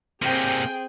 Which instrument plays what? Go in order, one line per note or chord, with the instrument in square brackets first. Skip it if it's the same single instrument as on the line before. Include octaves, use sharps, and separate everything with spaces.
[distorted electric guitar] C3 A#3 [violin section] C4 G#4 G5